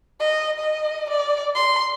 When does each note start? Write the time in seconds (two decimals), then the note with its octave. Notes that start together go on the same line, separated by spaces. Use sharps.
0.20 D#5
0.59 D#5
1.10 D5
1.55 C6